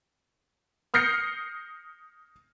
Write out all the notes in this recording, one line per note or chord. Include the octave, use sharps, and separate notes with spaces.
D#6 F6 G6 A#6 C7 C#7